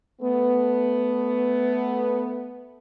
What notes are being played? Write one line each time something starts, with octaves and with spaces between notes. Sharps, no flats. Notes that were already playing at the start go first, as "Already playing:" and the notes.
A3 B3